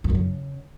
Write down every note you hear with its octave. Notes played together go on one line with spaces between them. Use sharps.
F2
F#2
C#3